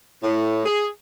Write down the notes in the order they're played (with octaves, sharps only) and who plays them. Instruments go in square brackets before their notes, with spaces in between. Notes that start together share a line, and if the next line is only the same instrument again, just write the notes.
[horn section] A2
G#4